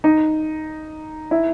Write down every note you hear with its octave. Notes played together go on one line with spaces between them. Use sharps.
D#4
E4